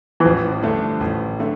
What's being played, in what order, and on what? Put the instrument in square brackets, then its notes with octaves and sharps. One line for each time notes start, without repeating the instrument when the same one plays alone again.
[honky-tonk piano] E3
[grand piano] A1 [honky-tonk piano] F3
[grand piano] G2 D3 A3 D4
A1
D3 A3